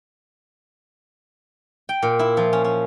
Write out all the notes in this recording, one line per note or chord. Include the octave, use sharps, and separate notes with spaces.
G5
A#2
E4
F3
C#4
C#4